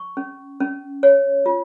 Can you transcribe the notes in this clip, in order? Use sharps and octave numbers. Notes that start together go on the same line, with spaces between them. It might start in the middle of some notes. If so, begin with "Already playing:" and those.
Already playing: C#6
C#4
C#4
C#5
F4